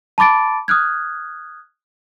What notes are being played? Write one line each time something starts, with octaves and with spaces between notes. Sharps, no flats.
A5 B5 D6 A6 D7
D#6 F6 F#6 G#6